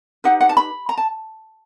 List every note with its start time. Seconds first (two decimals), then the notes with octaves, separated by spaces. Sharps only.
0.24 D#4 G4 B4 F#5
0.41 F#5
0.49 A5
0.57 B5
0.89 A#5
0.98 A5